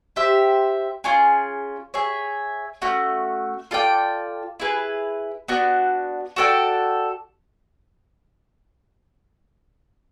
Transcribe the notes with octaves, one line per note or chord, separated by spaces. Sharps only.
G4 C5 E5
C#4 F4 G#4
G#4 C#5 E5
A3 C#4 F#4
F4 A4 D5 G5
E4 G#4 B4
B3 D4 F#4
F#4 A4 D5 G5